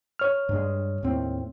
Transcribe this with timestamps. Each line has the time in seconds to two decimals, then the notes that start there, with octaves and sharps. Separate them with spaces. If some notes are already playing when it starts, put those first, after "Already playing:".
0.19 C#5 F6
0.49 G2 G#3
1.03 D#2 A2 C4